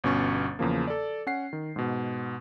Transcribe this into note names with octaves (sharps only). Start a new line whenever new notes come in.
G1 B2 C#4 C#6 A6
E2 C#3 F3 A#3
A4 D5
C#4 F#5 C7
D#3
G#2 B2